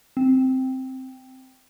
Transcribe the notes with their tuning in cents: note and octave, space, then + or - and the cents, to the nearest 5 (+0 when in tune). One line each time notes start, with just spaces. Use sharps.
C4 -5